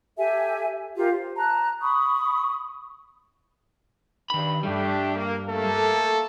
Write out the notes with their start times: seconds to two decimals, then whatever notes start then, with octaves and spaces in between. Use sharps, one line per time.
0.17 G4 A4 E5 G#5
0.97 F4 G4 A#4 F5
1.12 C5
1.37 A5 A#5 F#6
1.81 B5 C#6 D#6
4.30 G2 D#3 B5
4.63 G2 G3 A3 D4 G4
5.15 A#3
5.49 A3 A#3 A4